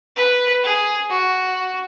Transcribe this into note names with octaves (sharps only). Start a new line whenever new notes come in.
B4
G#4
F#4